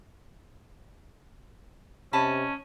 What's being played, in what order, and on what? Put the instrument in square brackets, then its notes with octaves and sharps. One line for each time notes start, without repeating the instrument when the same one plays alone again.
[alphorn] C3 [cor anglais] C#4 [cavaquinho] D#5 A5 B5